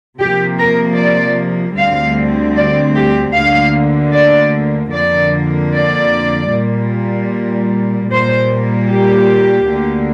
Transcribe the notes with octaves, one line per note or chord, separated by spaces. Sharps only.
C3 F3 A#3 G4
A#4
D5
D2 D3 G3 C4 F5
D5
G4
D2 D3 A#3 F5
D5
F2 D3 A#3 D5
D5
A#2 G3 A#3
A#2 G3 A#3 C5
G4
D2 D3 A#3